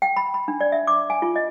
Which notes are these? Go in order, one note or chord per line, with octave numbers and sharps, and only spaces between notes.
G5
B5
B5
D4
D5
E5
D6
G#5
F4
D#5